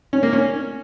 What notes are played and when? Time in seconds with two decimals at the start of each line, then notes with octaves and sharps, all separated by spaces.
0.13 C#4
0.23 A#3
0.33 C#4